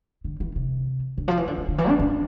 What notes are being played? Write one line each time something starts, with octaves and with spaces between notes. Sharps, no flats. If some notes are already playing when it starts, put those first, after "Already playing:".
D3
E3
C3
D3
F3
E3
D3
D3
D3
E3
D4
D4